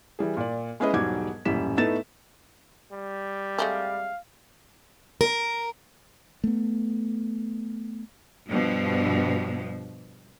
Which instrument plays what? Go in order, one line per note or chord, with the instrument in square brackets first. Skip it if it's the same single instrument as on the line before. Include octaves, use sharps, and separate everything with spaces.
[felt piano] E3 G3 G#4
A#2 D5
G#3 C#4 E4 G#4 B4 D#5
E1 G#2 F#3 G3 D6 G#6
D#1 A1 F#2 G3 B6 E7
A2 A3 B3 D#4 A6 E7
[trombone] G3
[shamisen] G#3 A3 C4 [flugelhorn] F5
[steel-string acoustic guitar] A#4
[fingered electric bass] A3 B3
[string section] G2 B2 F3